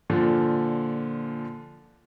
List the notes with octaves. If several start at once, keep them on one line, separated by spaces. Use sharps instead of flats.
A#2 D3 F3